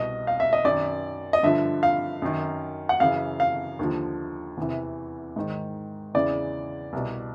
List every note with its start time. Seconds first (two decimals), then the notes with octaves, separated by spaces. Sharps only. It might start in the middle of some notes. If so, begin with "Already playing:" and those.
Already playing: C2 B2 D#5
0.27 F5
0.40 E5
0.53 D#5
0.64 F#2 D#3 D5
1.33 D#5
1.43 G2 D3 F3 E5
1.83 F5
2.22 F#2 D#3
2.89 F#5
3.00 F#2 C#3 E3 F5
3.40 F5
3.79 D#2 D3 F3
4.57 E2 C3 E3
5.36 G#2 D#3
6.14 E2 C#3 E3 D5
6.93 C2 B2